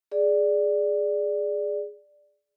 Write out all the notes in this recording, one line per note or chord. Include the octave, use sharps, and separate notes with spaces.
G#4 D5